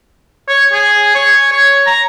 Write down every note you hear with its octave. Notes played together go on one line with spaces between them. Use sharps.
C#5
G#4
C#5
C#5
A#5